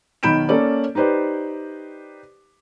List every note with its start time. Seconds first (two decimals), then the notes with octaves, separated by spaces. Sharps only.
0.23 B1 D#3 B5 G6 D7 E7
0.49 A#3 C#4 A4 C#5 D5
0.95 D#4 G4 B4 C5 D5